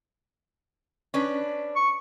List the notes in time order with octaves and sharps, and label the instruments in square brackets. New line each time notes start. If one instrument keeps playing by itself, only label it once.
[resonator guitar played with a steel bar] C#4 D4 B4
[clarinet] C#6